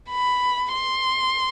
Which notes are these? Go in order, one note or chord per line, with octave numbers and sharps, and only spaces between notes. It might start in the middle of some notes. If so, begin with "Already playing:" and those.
B5
C6